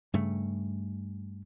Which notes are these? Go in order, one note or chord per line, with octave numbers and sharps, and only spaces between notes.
G2 C#3 A3